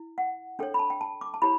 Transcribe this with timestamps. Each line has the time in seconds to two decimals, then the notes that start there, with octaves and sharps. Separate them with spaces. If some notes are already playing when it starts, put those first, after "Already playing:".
Already playing: E4
0.18 F#5
0.59 D4 A4 C#5 G5
0.74 B5
0.79 A5
0.90 G5
1.01 A5
1.21 D6
1.34 A5
1.42 E4 G4 C#5 B5